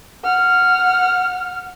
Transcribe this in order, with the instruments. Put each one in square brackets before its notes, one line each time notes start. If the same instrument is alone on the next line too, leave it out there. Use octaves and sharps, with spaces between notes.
[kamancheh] F#5 F6